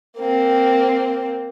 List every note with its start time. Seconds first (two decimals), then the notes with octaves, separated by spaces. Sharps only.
0.17 A#3 C4